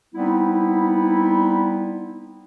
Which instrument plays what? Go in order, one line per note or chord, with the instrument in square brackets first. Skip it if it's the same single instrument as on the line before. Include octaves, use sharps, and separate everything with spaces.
[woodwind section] G3 B3 C4 D#4 E4